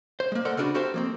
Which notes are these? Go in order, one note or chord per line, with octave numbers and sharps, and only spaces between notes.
C5
G#3 A#3
A4 A#4 C5 D5 F#5
C#3 B3 D4 F4 F#4
F#4 G4 A4 A#4 C5 F5
F3 A#3 C4